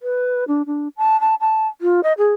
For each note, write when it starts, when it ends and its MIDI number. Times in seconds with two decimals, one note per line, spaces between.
0.02 0.44 71
0.48 0.62 62
0.66 0.88 62
0.97 1.19 81
1.21 1.35 81
1.41 1.67 81
1.81 2.01 65
2.03 2.13 75
2.18 2.34 68